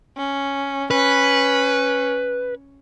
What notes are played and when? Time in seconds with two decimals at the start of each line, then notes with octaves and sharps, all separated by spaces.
0.17 C#4
0.91 C#4 B4